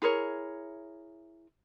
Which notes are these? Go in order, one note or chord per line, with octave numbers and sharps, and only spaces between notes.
E4 G#4 A#4 C#5